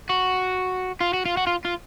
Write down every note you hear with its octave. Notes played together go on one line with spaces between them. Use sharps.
F#4
F4
F#4
F4
F#4
F4
F4